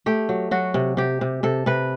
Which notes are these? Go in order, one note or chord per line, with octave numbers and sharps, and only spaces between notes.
A3 G4
F#3
F#3 F#4
C3
C3 G4
C3
C3 A4
C3 B4